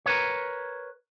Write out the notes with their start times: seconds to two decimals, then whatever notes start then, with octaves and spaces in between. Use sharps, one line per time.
0.06 A#4 B4 C#5